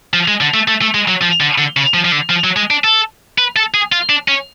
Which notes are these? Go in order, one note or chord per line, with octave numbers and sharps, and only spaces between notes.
F3
G#3
D3
A3
A3
A3
G#3
F#3
F3
D3
D3
C#3
F3
F3
D3
F3
F#3
G#3
D4
A4
B4
A4
G#4
F4
D4
C#4